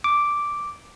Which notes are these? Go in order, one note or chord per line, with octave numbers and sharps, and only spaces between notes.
D6